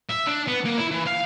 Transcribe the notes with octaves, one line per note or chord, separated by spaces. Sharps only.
E5
D4
B3
A#3
E4
E3
F5